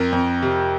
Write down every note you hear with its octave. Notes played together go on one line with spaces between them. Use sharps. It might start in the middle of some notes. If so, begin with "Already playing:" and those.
Already playing: F2 A#4
F2
C3